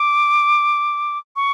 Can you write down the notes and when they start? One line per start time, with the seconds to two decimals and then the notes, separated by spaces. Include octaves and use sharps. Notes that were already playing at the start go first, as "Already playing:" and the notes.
Already playing: D6
1.36 C#6